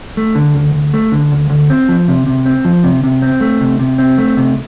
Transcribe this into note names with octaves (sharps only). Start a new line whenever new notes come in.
A3
D3
D2
D2
A3
D3
D2
D2
C4
F3
C3
C3
C4
F3
C3
C3
C4
A3
C3
C3
C4
A3
C3